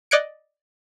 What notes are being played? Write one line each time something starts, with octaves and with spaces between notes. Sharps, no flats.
D5 D#5 F#6 G#6 C#7 D7